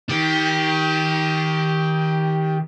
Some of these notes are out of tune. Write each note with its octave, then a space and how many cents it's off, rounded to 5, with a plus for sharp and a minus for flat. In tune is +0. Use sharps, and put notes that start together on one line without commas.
D#3 +30 G4 +0